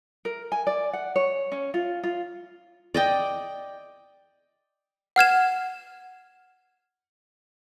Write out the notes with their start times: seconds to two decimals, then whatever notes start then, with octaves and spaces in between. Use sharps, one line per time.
0.25 A#4
0.52 G#5
0.67 D5
0.93 F#5
1.16 C#5
1.52 C#4
1.74 F4
2.03 F4
2.94 D5 D#5 G5
5.16 F#5 F6 G#6 E7